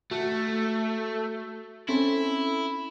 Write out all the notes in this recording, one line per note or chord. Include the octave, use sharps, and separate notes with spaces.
A3 F#4
C4 C#4 E4 A4